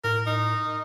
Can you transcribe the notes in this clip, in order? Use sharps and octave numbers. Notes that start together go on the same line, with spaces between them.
A2 A#4
D#4